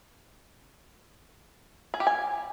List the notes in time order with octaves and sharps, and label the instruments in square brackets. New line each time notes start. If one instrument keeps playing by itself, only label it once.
[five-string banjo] G#4
G4
G#5